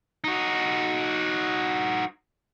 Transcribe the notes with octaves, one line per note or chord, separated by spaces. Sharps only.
D#4 F#4